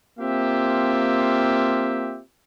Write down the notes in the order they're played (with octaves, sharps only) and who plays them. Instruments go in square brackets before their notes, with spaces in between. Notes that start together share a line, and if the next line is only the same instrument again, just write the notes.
[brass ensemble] A#3 C4 F4 G4 E5